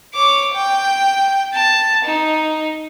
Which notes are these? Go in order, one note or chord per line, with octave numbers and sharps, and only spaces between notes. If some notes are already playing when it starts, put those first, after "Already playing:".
C#5 D6
G5
A5
D#4